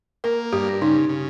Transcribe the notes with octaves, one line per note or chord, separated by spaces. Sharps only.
A#3 A#4
G2 G4
C#3 D#4
C#3